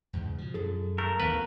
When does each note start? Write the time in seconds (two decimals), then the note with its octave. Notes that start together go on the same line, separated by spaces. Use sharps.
0.13 E2 G#2 C#3
0.38 B2 F3
0.54 F#2 G#4 A4
0.98 A3 A#4
1.20 A1 D#2 D#3 B3 B4 F5